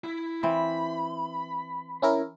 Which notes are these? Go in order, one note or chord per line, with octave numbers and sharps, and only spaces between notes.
E4
E3 C4 B5
C#4 E4 A#4